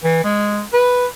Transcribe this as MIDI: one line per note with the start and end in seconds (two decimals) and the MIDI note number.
0.04 0.21 52
0.24 0.62 56
0.73 1.06 71